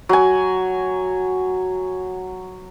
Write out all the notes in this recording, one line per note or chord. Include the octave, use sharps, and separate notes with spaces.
F#3 G#5